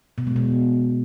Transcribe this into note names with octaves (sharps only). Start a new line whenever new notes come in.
B2
G#3
B2